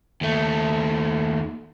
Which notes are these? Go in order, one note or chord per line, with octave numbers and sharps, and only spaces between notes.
D#2 A3